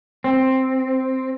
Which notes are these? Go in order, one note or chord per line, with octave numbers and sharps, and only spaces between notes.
C4